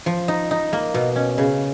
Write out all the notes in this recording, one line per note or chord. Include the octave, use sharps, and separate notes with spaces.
F3
D#4
D#4
A#3
B2
C#4
C#3